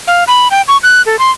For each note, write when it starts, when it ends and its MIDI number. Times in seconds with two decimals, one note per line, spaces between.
0.07 0.24 77
0.28 0.48 83
0.51 0.62 79
0.68 0.77 85
0.83 1.02 90
1.06 1.19 69
1.19 1.31 84